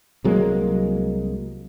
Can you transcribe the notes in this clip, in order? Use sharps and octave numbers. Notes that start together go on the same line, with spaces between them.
C2 F#3 G#3 A#3